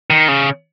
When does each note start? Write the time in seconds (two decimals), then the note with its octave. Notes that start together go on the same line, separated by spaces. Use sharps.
0.10 D#3
0.28 C#3